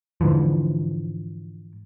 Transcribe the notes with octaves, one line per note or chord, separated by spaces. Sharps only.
G#2 D3 E3 F3